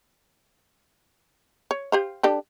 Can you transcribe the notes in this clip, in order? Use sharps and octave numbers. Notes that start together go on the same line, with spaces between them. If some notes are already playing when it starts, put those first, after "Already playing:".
C#5
G4 C5 F5
D4 G4 A4